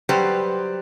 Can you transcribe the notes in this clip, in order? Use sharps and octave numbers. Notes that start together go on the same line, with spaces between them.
F#3 G3 G4 B4 C5